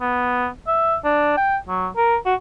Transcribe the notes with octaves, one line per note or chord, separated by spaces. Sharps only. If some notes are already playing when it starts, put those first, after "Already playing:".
B3
E5
D4
G5
F#3
A#4
F#4